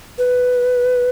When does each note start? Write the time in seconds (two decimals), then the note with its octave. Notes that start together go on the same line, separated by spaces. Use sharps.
0.18 B4